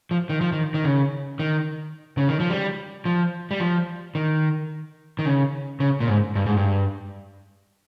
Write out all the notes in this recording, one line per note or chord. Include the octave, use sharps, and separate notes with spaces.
F3
D#3
F3
D#3
D#3
C#3
D#3
C#3
D#3
F3
G3
F3
G3
F3
D#3
D#3
C#3
C#3
A#2
G#2
G2
G#2
G2